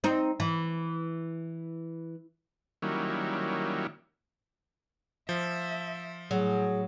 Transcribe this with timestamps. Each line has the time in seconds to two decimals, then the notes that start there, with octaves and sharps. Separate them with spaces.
0.04 C4 D#4
0.40 E3
2.82 D#3 F#3 G3 A#3 C#4 E4
5.29 F3 E5
6.31 A2 F#3 G#4